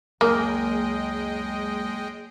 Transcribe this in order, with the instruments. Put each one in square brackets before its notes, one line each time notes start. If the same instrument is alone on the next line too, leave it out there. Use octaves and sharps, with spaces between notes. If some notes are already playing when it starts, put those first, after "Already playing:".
[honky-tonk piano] F#1 G#5 F6 [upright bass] C#2 [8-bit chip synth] G#3 D#5 G5 [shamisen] A#3